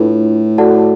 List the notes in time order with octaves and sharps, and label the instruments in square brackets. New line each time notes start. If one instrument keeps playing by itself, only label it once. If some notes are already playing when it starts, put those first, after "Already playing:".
Already playing: [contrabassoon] A2 [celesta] D4 F4 B4
[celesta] F#4 A4 D5 F#5 A5